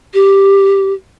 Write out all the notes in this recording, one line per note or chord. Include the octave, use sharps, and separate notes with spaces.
G4